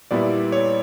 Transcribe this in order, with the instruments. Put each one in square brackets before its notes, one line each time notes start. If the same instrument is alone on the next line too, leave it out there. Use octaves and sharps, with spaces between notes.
[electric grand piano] A#2 G3 B3 E4 D5
C#5